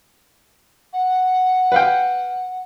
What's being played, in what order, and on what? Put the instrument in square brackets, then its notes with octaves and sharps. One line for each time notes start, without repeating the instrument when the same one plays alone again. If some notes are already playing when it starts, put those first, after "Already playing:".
[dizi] F#5
[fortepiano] B4 F5 G5